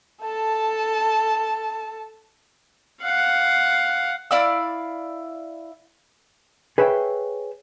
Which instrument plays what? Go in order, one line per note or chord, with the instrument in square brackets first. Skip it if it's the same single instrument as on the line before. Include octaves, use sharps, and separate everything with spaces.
[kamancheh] A4 A5
[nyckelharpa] F5 F#5
[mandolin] E4 D5 F5 E6
[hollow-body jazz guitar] G#4 B4 C#5 E5 F#5 G5